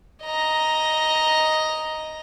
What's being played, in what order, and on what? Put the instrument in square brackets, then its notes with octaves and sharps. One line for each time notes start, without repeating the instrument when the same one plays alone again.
[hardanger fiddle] D#5 A#5